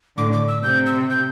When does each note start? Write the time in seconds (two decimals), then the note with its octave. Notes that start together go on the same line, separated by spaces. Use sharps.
0.18 A2 D3 D6
0.33 D6
0.48 E6
0.63 C3 G6
0.86 E6
1.10 G6